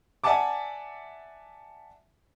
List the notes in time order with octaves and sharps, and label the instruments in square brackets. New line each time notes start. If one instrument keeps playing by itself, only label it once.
[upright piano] D5 E5 F#5 G#5 A5 D6